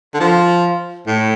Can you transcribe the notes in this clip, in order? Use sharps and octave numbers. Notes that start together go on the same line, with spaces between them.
D3
F3
A2